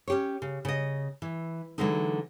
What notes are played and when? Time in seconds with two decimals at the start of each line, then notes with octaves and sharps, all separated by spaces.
0.08 C#4 G4 C#5
0.42 C#3
0.65 C#3 D#5
1.22 E3
1.78 D3 E3 F#3 G#3 A3 D#4